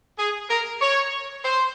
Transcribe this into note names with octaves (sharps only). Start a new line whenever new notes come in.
G#4
A#4
C#5
C5